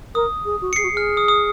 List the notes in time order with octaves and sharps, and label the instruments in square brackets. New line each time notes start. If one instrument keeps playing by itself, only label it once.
[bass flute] A#4 [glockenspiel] D#6
[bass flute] G#4
F#4
[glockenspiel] C#7
[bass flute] G#4 [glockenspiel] C7
[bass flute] F#4
[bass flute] G#4 [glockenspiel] F6
[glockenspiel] D#6
D#6